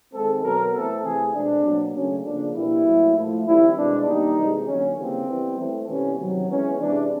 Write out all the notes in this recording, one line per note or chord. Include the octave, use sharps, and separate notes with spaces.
D#3 G#3 C4 A4
B2 F#3 B3 A#4
E3 A3 C4 A4
C3 E3 A3 G#4
B2 G#3 C4 D4
B2 F#3 A#3
C#3 F#3 A3 C#4
C#3 F3 A#3 D4
B2 G3 A#3 E4
A2 F#3 A#3
A2 F3 A3
D#3 G3 C4 E4
B2 G#3 B3 D4
D#3 G3 A#3 D#4
C3 E3 G#3
D3 F#3 A#3 C#4
C#3 E3 G3 A#3 C4
E3 G3 B3
E3 A3 C4
C3 E3 G3 B3 C#4
C3 D#3 F#3
E3 G#3 B3 C#4
C3 E3 G#3 C4 D4